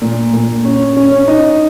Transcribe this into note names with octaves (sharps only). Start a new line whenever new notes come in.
A#2
A#2
C#4
C#4
C#4
D#4